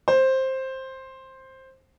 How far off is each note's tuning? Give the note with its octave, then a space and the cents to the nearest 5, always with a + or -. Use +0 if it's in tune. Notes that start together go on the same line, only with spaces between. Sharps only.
C5 +10